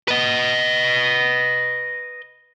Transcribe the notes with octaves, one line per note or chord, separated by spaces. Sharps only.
B4 D#5